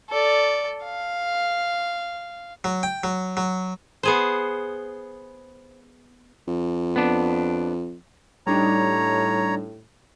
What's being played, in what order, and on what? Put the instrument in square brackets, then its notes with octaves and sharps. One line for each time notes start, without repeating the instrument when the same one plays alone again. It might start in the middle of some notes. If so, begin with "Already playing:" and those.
[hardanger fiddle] A4 D5
F5
[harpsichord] F#3
G5
F#3
F#3
[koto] B3 G#4 C5
[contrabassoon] F2
[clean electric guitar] B3 D4
[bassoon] A2 [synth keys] G3 D4 D#4 [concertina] C#5 A#5